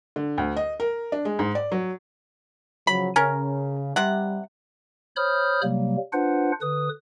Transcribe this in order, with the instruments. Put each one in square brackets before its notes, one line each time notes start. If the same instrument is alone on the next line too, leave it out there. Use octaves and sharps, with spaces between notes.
[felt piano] D3
D2
D#5
A#4
D4
G#3
G#2
D5
F#3
[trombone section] C#3 F3 F#3 [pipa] B5
[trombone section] C#3 [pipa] C#4 A#4
[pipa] C3 F#5 [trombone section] G3
[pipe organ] C5 C#5 B5 D#6 F6 G6
C3 F#3 G3 A#3
D4 F4 B4 C5 F#5
D3 B4 D#6